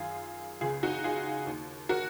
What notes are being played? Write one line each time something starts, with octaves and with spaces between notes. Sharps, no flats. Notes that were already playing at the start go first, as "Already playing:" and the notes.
Already playing: F#2 D#3 F4 G#4
C#2 C#3 F4 G#4
D#4 F#4
F4 G#4
D#2 D#3
F#4 A#4